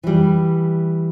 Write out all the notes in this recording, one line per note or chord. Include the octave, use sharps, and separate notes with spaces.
E3 G3